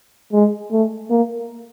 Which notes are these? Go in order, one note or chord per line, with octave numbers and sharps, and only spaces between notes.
G#3
A3
A#3